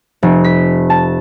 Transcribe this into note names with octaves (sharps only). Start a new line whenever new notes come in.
F1
B6
A5